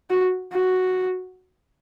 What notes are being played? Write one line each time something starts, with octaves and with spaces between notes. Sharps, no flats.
F#4
F#4